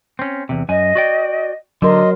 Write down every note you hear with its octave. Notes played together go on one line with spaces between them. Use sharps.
C4 C#4
E2 C3
F#2 D#5 G#5
F#4 D5 G5
D3 F#3 A#4 D#5 C6